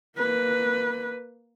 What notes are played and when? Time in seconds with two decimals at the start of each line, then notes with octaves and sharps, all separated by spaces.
0.18 A#3 B4